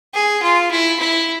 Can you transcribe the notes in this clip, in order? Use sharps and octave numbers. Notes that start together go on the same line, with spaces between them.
G#4
F4
E4
E4